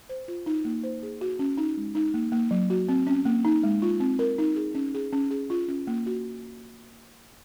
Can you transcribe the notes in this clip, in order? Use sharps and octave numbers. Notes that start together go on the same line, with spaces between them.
C5
F4
D#4
A#3
C5
G#4
F#4
C#4
D#4
G#3
D#4
A#3
A#3
F#3
F#4
C4
C#4
A#3
D#4
G#3
F4
C4
A#4
D#4
G#4
C#4
G#4
C#4
G#4
F4
C#4
A#3
F#4